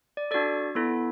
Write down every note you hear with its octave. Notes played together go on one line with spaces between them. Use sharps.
D5
D4 F#4 A4 D5
B3 E4 A4